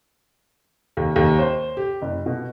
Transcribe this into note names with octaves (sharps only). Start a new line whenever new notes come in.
D#2
D#2
C5
G4
F#1
B2